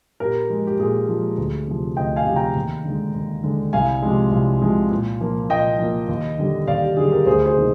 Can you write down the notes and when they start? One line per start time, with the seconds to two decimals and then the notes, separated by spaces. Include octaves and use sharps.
0.20 A#2 G4 A#4
0.50 F3 G#3
0.67 G4
0.80 A#2 G#4
1.08 F3 G#3
1.38 D2
1.68 C3 F3
1.97 D2 D#5 G5
2.16 F5 G#5
2.26 C3 F3
2.36 G5 A#5
2.56 D#2
2.85 D3 G#3
3.14 D#2
3.43 D3 G#3
3.73 C2 F5 G#5
4.02 C3 F3 G#3
4.32 C2
4.62 C3 F3 G#3
4.91 A#2
5.21 F3 A#3
5.49 A#2 D#5 G5
5.79 F3 A#3
6.09 D#2
6.39 D3 G3
6.67 D#2 D5 F5
6.82 G4
6.97 D3 G3 G#4
7.12 G4 A#4
7.26 D2 G#4 C5
7.46 G#4 C5
7.57 C3 D#3 A#3